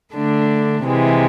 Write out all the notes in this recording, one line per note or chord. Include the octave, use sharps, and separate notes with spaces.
D3 A3 D4
C3 E3 G#3